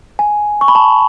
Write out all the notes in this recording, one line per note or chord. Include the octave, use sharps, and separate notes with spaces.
G#5
C#6
B5
A5